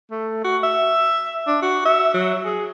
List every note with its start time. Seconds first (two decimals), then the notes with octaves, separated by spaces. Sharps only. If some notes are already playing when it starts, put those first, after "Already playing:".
0.11 A3
0.44 F#4
0.63 E5
1.47 D4
1.62 F#4
1.85 E5
2.14 F#3
2.45 G#4